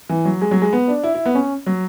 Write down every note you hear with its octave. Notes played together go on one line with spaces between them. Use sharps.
E3
F#3
G#3
F#3
G#3
B3
D4
E4
E4
B3
C#4
F#3